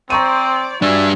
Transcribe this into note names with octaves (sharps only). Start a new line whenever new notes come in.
C4 C5 D5 A#5 C#6 D#7
G3 D4 F#4 E5 G#5